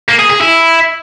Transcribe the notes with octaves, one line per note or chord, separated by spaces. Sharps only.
A#3
G#4
G#4
E4